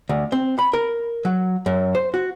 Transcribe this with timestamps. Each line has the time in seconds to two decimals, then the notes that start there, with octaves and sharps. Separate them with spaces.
0.09 D2
0.32 C4
0.59 B5
0.73 A#4
1.25 F#3
1.66 F#2
1.95 C5
2.14 F#4